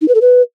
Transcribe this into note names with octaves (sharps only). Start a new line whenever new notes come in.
D#4
B4
A4
B4